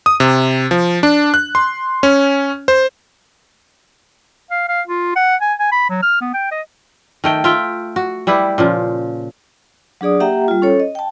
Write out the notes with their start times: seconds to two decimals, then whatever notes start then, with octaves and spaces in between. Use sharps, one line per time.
0.06 D#6
0.20 C3
0.71 F3
1.03 D4
1.34 F#6
1.55 C6
2.03 C#4
2.68 C5
4.51 F5
4.69 F5
4.87 F4
5.16 F#5
5.42 G#5
5.59 G#5
5.72 B5
5.90 F#3
6.03 F6
6.21 B3
6.34 G5
6.51 D#5
7.24 D#3 A3 G5
7.44 F4 E5 G5
7.96 F#4
8.27 G3 E4 G4 B4
8.58 A#2 C#3 F3
10.01 F#3 D4 G#4 D5 D#6
10.20 A#3 G4 E5 F#5 G5 A#5
10.48 G3 F4
10.62 C#4 A4 C#5
10.80 D#5
10.95 G5 A5